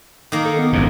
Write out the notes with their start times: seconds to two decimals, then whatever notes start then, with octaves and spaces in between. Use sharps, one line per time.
0.32 D#3 A#3
0.45 A4
0.59 B3
0.73 G#1 F2 G#2